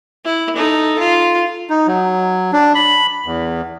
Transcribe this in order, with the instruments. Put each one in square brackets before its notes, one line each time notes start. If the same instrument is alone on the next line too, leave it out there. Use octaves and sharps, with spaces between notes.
[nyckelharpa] E4
D#4 A4
F4
[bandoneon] D#4
F#3
D4
B5
E2